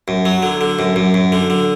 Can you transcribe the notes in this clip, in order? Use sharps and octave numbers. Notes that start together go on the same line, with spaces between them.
F#2
F#3
D3
D3
F#2
F#2
F#2
D3
D3